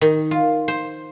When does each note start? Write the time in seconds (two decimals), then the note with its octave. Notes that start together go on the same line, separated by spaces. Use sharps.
0.01 D#3
0.31 F4
0.68 C5